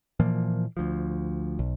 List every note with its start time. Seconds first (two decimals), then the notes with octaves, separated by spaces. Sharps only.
0.20 A#2 E3 F3 A#3
0.77 D2 F3
1.59 B1